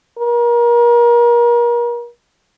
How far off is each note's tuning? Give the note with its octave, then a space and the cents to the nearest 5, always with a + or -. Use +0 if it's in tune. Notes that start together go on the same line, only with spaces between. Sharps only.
A#4 +35